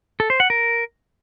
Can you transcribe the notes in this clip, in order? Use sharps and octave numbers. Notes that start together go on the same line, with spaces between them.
A4
C5
F#5
A#4